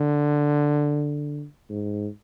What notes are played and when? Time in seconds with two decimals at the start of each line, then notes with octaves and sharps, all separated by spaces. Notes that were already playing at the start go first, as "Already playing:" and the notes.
Already playing: D3
1.70 G#2